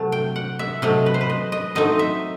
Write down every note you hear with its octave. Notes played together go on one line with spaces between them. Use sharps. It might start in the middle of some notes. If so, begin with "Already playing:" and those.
Already playing: C3 F#3 A3 A5
G5
F#5
E5
C3 F#3 A3 D#5
B4
C5
B4
D#5
D#5
F#3 A3 C4 D#4 D#5
E5